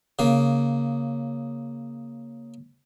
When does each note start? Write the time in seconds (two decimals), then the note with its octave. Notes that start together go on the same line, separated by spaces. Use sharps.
0.19 C#3 A#3